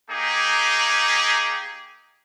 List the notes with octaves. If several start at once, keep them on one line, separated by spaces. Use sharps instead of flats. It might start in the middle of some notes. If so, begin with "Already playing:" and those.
A#3 D#4 G4 G#4